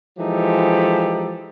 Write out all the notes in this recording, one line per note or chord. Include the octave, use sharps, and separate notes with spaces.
E3 F3 G#3 D#4 G4 A4